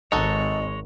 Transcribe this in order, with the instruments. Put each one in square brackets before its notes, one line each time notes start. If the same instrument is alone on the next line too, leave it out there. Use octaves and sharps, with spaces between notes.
[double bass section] G#1 [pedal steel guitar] G#3 C#5 [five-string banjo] D#4 F#4 A4 [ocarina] D#5